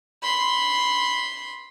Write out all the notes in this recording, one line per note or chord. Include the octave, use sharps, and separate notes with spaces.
B5 C6